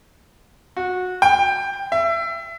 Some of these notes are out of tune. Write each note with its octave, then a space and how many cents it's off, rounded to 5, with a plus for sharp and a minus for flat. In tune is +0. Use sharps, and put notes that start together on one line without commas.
F#4 -20
G5 +10
E5 +25